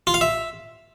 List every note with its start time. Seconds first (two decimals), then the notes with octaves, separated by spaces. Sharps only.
0.07 F4
0.14 F5
0.21 E5